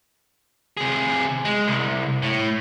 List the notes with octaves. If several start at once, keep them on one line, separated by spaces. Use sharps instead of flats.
C3 G#4
G#3
C2
A2